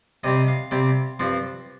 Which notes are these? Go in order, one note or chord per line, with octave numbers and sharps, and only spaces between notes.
C3 G3 C4 D#5
F5
C3 G3 C4
G2 F3 C4